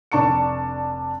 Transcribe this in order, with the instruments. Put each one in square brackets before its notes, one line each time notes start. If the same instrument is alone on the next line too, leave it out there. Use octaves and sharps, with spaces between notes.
[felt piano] F1 D4 A5 C#6 C#7